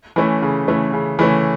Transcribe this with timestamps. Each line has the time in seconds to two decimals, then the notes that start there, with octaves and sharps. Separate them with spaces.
0.16 E3 A3 C#4
0.42 C#3
0.68 E3 A3 C#4
0.93 C#3
1.19 E3 A3 C#4